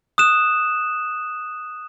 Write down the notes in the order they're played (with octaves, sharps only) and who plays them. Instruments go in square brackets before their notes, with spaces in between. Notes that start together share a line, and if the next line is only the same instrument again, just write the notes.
[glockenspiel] D#6 F#6 E7